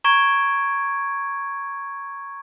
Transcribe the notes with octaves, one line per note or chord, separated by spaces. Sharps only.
A#5 C#6 G#6 D7